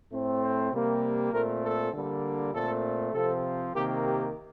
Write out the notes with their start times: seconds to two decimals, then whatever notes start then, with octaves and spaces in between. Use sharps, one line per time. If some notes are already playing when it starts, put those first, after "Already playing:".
0.12 A2 A3 C4
0.42 C5
0.72 C3 G3 A#3
1.32 A#2 A3 C4 A#4
1.62 A4
1.93 D3 G3 A#3
2.53 A#2 A3 C4 A4
3.13 C3 F3 C4 A4
3.73 C3 D#3 A#3 G4
4.03 G4